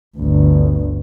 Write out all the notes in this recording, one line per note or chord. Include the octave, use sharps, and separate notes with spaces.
G1 D2